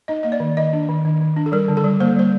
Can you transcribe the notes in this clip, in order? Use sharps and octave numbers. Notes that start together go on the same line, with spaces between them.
D#4 D#5
A#3 D#5
D5
D#3
D#3 D#5
D4
D#3
D#3
D#3
D4
A4
G3 A#4
D3
A4
G3
A#3 C5
G3 C5